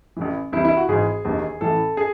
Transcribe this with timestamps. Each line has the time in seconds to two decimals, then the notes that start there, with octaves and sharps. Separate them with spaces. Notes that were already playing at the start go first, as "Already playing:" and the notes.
0.17 A1 A2 E3
0.52 C2 C3 E3 E4
0.65 E4
0.77 F#4
0.88 G#1 G#2 E3 G#4
1.25 E1 D#2 D#3
1.61 A1 A2 E3 A4
1.97 G#4